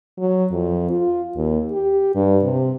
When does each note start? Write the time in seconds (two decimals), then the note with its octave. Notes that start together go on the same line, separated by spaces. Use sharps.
0.19 F#3
0.51 F2
0.90 F4
1.36 D#2
1.72 G4
2.15 G2
2.44 C3